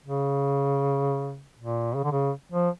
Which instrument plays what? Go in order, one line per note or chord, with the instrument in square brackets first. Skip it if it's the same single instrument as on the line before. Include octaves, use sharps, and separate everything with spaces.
[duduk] C#3
A#2
C#3
D3
C#3
F3